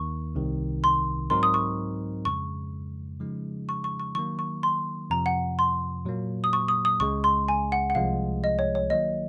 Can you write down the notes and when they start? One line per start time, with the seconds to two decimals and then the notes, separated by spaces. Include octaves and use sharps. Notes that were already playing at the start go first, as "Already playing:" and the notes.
Already playing: D#2 D#3 A#3 C#6
0.35 C2 C3 D#3
0.84 C6
1.30 G#2 F#3 C4 D#4 A#4 C6
1.43 D#6
1.54 C#6
2.25 F2 C#3 G#3 C#6
3.20 C#3 F3 G#3 D#4
3.69 C#6
3.84 C#6
4.00 C#6
4.15 D#3 F#3 A#3 C#6
4.39 C#6
4.63 C6
5.10 F2 C3 F3 A#5
5.26 F#5
5.59 C6
6.05 A#2 F#3 A#3
6.44 D#6
6.53 C#6
6.68 D#6
6.85 D#6
7.00 C#2 C#3 G#3 C#6
7.24 C6
7.48 G#5
7.72 F#5
7.90 F#5
7.95 C2 C3 F3 G#3 F5
8.44 D#5
8.59 C#5
8.75 C#5
8.90 D#3 F#3 A#3 D#5